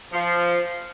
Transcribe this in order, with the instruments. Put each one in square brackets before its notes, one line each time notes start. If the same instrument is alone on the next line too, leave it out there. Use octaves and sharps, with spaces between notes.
[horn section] F3